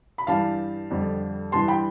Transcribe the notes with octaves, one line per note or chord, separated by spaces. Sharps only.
B5
G2 E3 G3 F5 A5
F2 D3 G3
G2 E3 G3 A5 C6
G5 B5